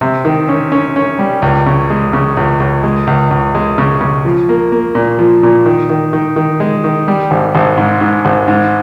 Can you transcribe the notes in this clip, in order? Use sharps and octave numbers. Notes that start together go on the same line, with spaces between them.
C3
D#3
C#4
C#4
C#4
G3
C#2
C#3
G#3
C#3
C#2
C#2
G#3
C#2
C#2
G#3
C#3
C#3
F3
A#3
A#3
A#2
F3
A#2
D#3
D#3
D#3
D#3
G#3
D#3
G3
G#1
G#1
G#2
G#2
G#1
G#2